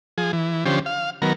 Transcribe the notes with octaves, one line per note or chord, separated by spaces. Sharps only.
F3 G#4
E3
D3 F3 C#4 G4 C5
F5
D#3 F#3 B3 A#4